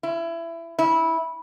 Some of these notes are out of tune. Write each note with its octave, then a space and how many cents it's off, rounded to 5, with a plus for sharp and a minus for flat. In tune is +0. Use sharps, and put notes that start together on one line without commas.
E4 +20
E4 -15